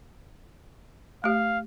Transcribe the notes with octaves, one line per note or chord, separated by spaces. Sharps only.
A3 G4 F5